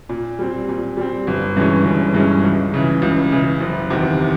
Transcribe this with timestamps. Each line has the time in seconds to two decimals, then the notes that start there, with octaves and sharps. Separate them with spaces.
0.09 A#2
0.39 G3 C4
0.69 A#2
0.97 G3 C4
1.27 G1
1.57 G2 E3 G#3 C#4
1.85 G1
2.14 G2 E3 G#3 C#4
2.44 C#2
2.74 C#3 E3
3.02 C#2
3.32 C#3 E3
3.61 F#1
3.90 E2 C3 D#3